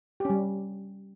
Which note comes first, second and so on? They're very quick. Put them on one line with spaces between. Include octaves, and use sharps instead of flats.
G4 C#4 G3